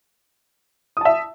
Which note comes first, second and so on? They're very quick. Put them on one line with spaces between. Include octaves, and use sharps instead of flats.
D#6 A5 E5